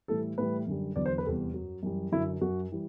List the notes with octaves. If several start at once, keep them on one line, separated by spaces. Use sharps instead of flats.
A2 E3 G3 A4
A2 E3 G3 B4
F#2 D3 G3
E2 D3 F#3 D5
C5
B4
E2 C3 G3 A4
F#2 F#3
F#2 E3 G3
F#2 D3 F#3 E4
F#2 F#3 F#4
E3 G3